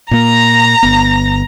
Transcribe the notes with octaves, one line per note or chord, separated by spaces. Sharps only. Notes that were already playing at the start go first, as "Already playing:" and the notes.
A#2 A#3 A#5 A#6
G1 B3